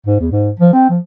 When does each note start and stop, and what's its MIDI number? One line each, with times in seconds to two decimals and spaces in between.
0.06 0.18 44
0.20 0.28 40
0.32 0.52 44
0.59 0.72 53
0.73 0.88 60
0.89 0.99 53